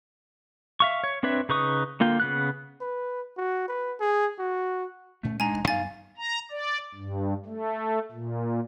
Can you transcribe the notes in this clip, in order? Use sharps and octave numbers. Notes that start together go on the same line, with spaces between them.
E5 F5 C#6
C#5
C4 D4 B4 C#5 E5
C#3 D#4 B4 C#6 D#6
D3 A#3 F4 G5
C#3 B3 F#6
B4
F#4
B4
G#4
F#4
D2 A#2 A3 C#4
G#3 D4 D#4 G#5 A#5
E1 E2
F#2 B3 D#4 F5 G#5 A6
A#5
D5
G2
A3
A#2